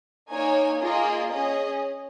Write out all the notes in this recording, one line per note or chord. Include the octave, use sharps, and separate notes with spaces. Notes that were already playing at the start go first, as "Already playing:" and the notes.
A#3 D#4 C#5 G#5
A#3 F4 G#4 D#5
C#4 G#4 D#5